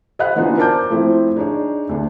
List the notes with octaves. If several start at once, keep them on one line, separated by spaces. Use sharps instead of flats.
C5 D#5 F5 F#5 B5 F#6
E3 B3 D4 D#4 F4 F#4
A#4 C5 A5 D6 G6
F3 A3 C4 E4
D4 D#4 G#4 C#5
D2 D4